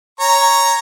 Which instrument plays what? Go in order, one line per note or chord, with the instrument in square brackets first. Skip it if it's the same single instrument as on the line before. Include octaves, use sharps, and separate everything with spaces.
[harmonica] C#5 A#5 C#6